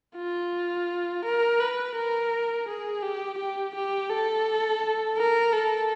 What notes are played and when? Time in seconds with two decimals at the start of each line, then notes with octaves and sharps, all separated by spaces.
0.17 F4
1.25 A#4
1.59 B4
1.96 A#4
2.67 G#4
3.02 G4
3.38 G4
3.75 G4
4.10 A4
5.17 A#4
5.53 A4